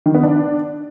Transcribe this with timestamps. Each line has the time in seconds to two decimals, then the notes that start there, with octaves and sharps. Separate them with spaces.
0.06 D#3
0.14 B3
0.23 D4